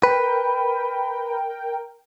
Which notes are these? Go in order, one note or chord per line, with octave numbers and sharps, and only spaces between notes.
A#4 B4 G5